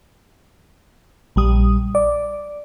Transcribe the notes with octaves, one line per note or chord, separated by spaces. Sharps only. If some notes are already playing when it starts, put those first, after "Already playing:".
A#1 G3 D#6
D5